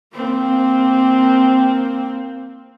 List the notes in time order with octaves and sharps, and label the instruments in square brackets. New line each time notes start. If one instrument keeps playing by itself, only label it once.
[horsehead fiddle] A#3 C4